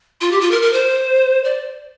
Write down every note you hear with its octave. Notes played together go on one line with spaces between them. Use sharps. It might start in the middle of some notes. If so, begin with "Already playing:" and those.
F4
G4
F4
A#4
A#4
C5
D5